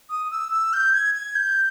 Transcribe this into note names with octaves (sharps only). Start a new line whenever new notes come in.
D#6
E6
E6
G6
G#6
G#6
G6